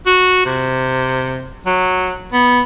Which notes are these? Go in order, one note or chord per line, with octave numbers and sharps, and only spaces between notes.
F#4
C3
F#3
B3